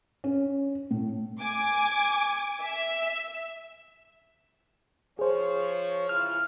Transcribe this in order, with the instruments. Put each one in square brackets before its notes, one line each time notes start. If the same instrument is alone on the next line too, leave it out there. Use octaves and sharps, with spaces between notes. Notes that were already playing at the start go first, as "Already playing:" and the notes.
[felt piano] C#4
A2
[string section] G#5 D6
E5
[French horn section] F3 C#5 [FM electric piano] G#4 C5
[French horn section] C#3 E3 F4 [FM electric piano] F6